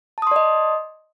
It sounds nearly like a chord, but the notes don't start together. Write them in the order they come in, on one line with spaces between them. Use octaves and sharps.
A5 D#6 C6 D5 D#5